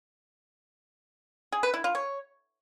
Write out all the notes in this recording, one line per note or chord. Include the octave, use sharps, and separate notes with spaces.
G#4
B4
E4
F4
C#5